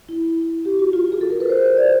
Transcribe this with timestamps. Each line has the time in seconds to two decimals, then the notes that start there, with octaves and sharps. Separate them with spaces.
0.09 E4
0.65 G4
0.79 F#4
0.93 F4
1.12 G#4
1.21 A4
1.30 A#4
1.40 B4
1.49 C5
1.77 D5